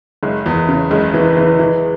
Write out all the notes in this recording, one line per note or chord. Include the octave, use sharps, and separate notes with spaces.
F#1 G#3
E2
C#3
F#1 G#3
E3
E3
E3